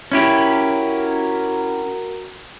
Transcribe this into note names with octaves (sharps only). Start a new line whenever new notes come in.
C#4 E4 F#4 G4 A#4